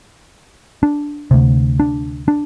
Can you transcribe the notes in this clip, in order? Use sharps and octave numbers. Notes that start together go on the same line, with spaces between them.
D4
D2 C3
D4
D4